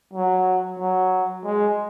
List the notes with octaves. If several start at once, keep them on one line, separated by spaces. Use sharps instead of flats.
F#3
F#3
G#3